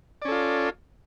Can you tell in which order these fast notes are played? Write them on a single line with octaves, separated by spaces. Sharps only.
D5 C#4 A4 F4